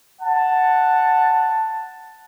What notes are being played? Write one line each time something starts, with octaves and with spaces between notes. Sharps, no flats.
F#5 A5